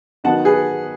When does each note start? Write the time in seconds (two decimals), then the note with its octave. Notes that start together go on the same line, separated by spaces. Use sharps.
0.24 D#3 F#3 B3 D#4 F#5 A5
0.45 G#4 B4